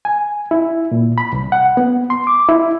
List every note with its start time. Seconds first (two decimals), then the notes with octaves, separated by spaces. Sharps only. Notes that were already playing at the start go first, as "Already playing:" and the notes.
0.05 G#5
0.51 E4
0.92 A#2
1.18 B5
1.33 C2
1.52 F#5
1.77 B3
2.10 C6
2.27 D6
2.48 E4